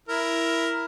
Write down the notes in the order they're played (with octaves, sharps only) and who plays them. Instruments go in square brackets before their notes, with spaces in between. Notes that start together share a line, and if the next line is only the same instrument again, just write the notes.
[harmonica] E4 A#4